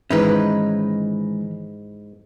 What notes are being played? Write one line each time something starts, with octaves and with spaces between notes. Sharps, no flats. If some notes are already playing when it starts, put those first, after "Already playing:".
G#2 D#3 E3 G#3 C#4 D#4 E4 B4